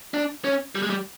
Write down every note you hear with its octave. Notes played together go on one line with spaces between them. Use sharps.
D4
C#4
G3
G#3
G3